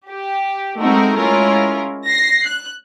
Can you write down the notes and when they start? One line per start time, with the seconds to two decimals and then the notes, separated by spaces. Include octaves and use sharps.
0.10 G4
0.79 G#3 A3 C4 D#4 F#4 A#4
1.17 G#3 C#4 E4 F4 A#4
2.09 A#6 C7
2.46 F#6